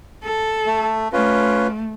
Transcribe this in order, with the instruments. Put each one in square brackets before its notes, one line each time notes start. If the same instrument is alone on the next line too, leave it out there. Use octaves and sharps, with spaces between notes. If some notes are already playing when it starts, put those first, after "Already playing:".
[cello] A4
[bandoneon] A3
[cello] A3 [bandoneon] C#4 F4 B4